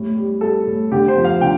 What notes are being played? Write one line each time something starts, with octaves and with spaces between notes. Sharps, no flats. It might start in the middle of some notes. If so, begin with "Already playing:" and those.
Already playing: A2 G3
G3
G3 A4
A2
D3 G4
C5
F3
F5
D3 G5